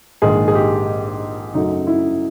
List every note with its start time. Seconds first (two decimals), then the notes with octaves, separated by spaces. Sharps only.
0.22 A#1 G#2 D#3 G#4
0.48 G#4
0.55 G4
1.54 F#2 C#3 F#3 A3 D#4
1.87 E4